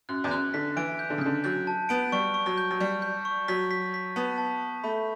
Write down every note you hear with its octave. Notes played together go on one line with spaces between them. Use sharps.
F#2 F#6
E2
F#2 F#6
D3 B6
E3 D7
G6
D3
C#3
D3 G6
F#3 G6
A5
B3 D7
G3 C#6
C#6
F#3
G6
F#3
G3 G6
G6
C#6
F#3 B6
B6
B6
B3 A5
A5
A5
A3 B5